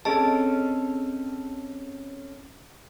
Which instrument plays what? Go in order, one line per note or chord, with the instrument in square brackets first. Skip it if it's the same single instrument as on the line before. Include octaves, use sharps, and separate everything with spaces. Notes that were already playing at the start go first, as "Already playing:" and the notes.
[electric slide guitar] C4 C#4 A4 [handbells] G#4 D#5 A5